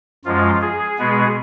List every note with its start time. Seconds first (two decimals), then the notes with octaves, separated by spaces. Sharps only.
0.25 F#2 F3 G#3 F4
0.62 G#4
0.98 B2 G#3 B3